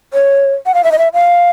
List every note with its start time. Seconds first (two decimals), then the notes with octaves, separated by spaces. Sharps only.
0.13 C#5
0.66 F#5
0.74 F5
0.84 E5
0.92 D#5
0.98 E5
1.14 F5